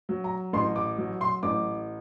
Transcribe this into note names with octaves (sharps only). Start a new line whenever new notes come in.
F#3
A#5
A1 C6
D6
F#3
C6
A1 D6